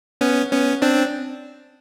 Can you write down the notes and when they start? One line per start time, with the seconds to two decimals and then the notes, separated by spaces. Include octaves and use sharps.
0.21 B3 C#4
0.52 B3 C#4
0.82 C4 D4